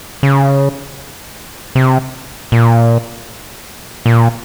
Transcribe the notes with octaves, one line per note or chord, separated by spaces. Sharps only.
C#3
C3
A#2
A#2